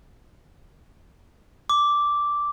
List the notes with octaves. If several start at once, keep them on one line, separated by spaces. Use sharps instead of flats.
D6